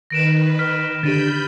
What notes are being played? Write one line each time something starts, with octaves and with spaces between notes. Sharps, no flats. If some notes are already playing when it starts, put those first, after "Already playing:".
D#3 B4 A#6 D7 E7
F6 B6
D3 D4 G4 B5 G6 A6 D7 D#7